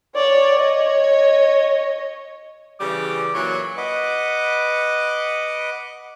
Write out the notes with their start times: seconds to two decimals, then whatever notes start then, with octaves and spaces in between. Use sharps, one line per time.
0.15 C#5 D5
0.60 C#5 D#5
2.80 C#3 E3 G3 D6
3.35 A#2 E3 F#3 C#6
3.77 B4 D#5 F#5 D6